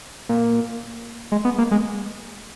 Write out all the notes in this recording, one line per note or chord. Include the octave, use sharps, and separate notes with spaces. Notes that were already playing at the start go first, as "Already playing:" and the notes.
A#2
G#3
B3
A#3
G#3